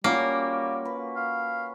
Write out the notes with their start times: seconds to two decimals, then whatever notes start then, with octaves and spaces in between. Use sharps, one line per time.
0.04 G3 A#3 C#4 F4 F#4
0.85 B4
1.16 F5